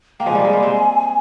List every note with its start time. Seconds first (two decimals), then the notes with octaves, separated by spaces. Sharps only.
0.20 A#3 G5
0.26 F3 G#3 G#5
0.35 G3 A#3
0.45 G#3 C4
0.53 G3 A#3
0.63 G#3 C4